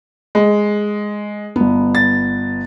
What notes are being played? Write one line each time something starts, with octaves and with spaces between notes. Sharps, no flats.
G#3
G1 B3
A6